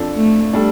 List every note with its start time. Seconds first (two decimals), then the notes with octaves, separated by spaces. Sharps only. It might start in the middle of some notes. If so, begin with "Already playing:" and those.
Already playing: F2 F3 D4 A4
0.15 A3
0.53 G3 D4 A4